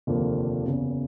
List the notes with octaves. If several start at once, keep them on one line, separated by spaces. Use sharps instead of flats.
F1 D#2 D3 F3 A#3
F#1 E2 C#3